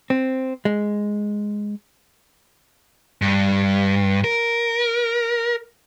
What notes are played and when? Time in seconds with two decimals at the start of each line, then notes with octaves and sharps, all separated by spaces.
0.10 C4
0.65 G#3
3.22 G2
4.24 A#4